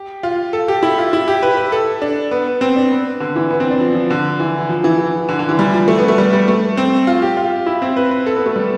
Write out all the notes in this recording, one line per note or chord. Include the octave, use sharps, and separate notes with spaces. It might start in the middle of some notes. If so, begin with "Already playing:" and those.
Already playing: G4
F4
A4
G4
E4
F4
E4
G4
B4
B4
A4
D4
B3
C4
D4
B3
D3
E3
B3
C4
D4
F3
F3
D3
E3
F3
E3
E3
D3
D3
E3
G3
F3
A3
B3
A3
G3
G3
A3
C4
F4
G4
F4
E4
C4
B4
B4
A4
B3
A3
G3